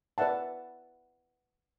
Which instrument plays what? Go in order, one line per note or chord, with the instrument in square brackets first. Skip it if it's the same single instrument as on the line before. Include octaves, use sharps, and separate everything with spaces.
[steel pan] B4 D5 E5 F#5 A5